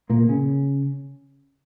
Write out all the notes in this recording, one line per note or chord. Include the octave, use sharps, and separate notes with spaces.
A#2 A#3
C#3 C#4